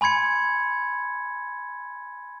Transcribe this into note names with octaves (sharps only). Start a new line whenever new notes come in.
G#5 B5 C6 G#6 C#7